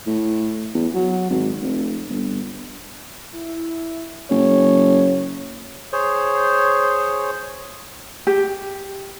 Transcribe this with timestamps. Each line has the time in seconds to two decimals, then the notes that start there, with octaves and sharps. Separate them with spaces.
0.07 A2
0.74 E2
0.94 F#3
1.30 G#1
1.62 F1
2.09 G1
3.34 E4
4.30 F#1 C#5
5.93 G#4 C5 C#5
8.27 G4